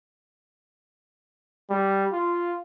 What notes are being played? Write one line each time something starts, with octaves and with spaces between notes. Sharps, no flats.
G3
F4